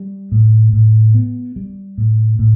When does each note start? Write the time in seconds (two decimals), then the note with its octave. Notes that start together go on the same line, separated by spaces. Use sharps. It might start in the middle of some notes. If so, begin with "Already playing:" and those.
Already playing: G3
0.32 A2
0.73 A2
1.14 B3
1.56 G3
1.98 A2
2.39 A2